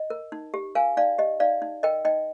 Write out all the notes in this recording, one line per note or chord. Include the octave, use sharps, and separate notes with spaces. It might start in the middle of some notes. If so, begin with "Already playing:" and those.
Already playing: D#5
A#4
D#4
G4
A#4 F5 G#5
D#4 D5 F5
G4 D#5
D#4 D5 F5
D#4
A#4 D#5 G5
D#4 D#5 G5